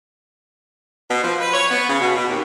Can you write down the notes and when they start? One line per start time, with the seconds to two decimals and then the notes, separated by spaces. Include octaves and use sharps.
1.09 B2
1.22 F3
1.40 B4
1.53 C#5
1.71 B3
1.88 C#3
2.00 B2
2.16 B2
2.29 D#2